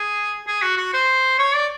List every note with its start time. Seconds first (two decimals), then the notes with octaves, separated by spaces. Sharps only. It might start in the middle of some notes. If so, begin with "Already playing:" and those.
Already playing: G#4
0.48 G#4
0.62 F#4
0.77 F#4
0.94 C5
1.39 C#5
1.55 D5